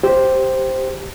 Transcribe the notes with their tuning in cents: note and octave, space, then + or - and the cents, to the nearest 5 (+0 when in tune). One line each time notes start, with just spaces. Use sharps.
G4 +0 C5 +0